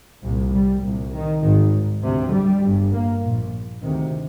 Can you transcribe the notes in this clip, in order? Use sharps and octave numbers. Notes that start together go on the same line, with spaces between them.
C2 A#2
G3
C2 A#2
D#3
G#1 G#2 D#3
D2 C3
G3
G1 G2
A#3
A#1 A#2
D2 C3 D#3